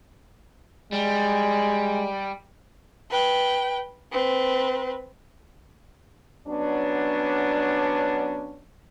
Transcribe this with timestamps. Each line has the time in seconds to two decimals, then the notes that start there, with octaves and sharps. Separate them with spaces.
0.92 G3 G#3
3.10 B4 G5
4.12 C4 B4
6.48 F#3 B3 C#4 D4